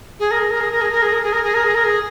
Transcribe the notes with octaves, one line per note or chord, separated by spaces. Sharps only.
G#4
A#4
G#4
A#4
G#4
A#4
G#4
A#4
G#4
A#4
G#4
A#4
G#4
A#4
G#4
A#4
G#4